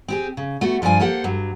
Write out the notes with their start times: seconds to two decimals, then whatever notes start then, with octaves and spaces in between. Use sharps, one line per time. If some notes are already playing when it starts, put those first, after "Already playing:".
0.08 C4 G4 G#4
0.37 C#3
0.61 A3 B3 F#4
0.82 G2 F3 D4 C5 G#5
1.00 A#3 G4 A4 C5 F#5
1.24 G2 F#3